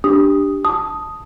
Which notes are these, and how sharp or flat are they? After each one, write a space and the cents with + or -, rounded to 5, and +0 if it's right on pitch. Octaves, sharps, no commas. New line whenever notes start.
D4 +0 G4 +0 D#6 +0
A5 +0 D#6 +0